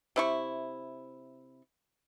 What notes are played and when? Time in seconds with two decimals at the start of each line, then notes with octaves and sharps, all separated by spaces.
0.16 C3 E4 C#6